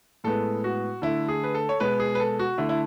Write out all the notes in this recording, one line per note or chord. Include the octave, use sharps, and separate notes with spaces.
A2 G#3 B3 A4
F#4
D3 A3 E4
G#4
B4
A4
C#5
B2 G#3 B3 B4
G#4
B4
A4
F#4
D3 A3 E4
E4